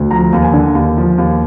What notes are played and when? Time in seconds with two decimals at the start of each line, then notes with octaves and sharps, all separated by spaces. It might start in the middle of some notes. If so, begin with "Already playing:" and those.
Already playing: D2
0.11 F3 A#5
0.33 D#2
0.42 G#5
0.53 D3
0.75 D#2
0.97 F3
1.18 D#2